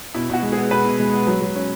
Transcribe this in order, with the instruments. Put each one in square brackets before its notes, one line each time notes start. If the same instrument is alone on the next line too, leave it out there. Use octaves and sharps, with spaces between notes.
[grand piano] B2 [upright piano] E4
[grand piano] B2 [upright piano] F#4
[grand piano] G#3
[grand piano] B3 [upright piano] G#4
[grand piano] B2 [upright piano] B4
[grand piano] B2
G#3
B3
[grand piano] F#3 [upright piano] B4
[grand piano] F#3
C#4